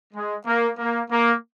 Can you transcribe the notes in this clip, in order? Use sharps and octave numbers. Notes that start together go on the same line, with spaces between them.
G#3
A#3
A#3
A#3